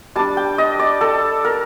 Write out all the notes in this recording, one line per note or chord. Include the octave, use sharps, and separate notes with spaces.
G3 D4 A5
G5
D#5
D5
A4
A#4